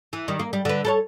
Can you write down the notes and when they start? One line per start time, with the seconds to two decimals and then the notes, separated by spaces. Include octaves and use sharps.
0.13 E3
0.28 D#3 G3
0.39 A#3
0.53 G3
0.65 D3 B4
0.85 A4 A#4 C#5